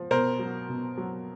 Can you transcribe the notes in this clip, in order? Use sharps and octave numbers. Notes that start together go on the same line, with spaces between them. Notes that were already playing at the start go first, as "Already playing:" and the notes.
Already playing: F3
B2 A#4 C5
F#3
B2
F#3